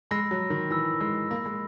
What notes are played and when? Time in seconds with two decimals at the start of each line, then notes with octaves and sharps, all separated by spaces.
0.11 G#3 B5 E6 A#6
0.31 F#3
0.50 D#3
0.71 E3 B5 E6 A#6
1.00 G#3
1.30 A#3 B5 E6 A#6
1.46 G#3